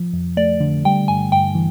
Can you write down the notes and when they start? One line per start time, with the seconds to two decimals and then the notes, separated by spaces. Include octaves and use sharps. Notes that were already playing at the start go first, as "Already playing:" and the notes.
Already playing: F3
0.13 F2
0.37 A3 D5
0.60 D3
0.85 G3 G5
1.08 G2 G#5
1.32 G2 G5
1.55 E3